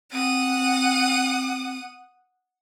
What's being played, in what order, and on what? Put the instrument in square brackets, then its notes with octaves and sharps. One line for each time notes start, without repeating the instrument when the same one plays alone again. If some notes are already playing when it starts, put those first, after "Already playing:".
[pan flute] C4 [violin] F#5 D#6